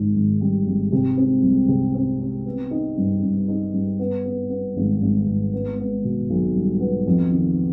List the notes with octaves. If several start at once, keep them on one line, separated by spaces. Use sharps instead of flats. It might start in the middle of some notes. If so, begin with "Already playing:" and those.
Already playing: G#1 G#2 D#3
G#1
G3
G#1
C3
C4
C2
C3
C4
C4
B3
D#4
G2
G2
D#4
G2
B3
B3
B3
G#1
G#1
G#1
B3
B3
B2
B1
G3
B3
F2
D#3